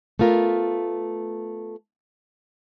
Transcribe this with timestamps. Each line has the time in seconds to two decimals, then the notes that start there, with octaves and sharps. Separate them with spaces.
0.19 A3 B3 F4 A#4